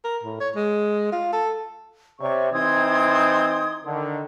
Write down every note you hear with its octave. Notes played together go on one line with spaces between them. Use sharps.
A#4
A2
C#5
G#3
F4
A4
C3 C#5 D5 C#6
E3 C4 D#4 C6 D#6 G#6
D3 D#3